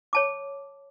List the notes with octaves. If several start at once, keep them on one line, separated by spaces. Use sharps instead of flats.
C#5 A5 D6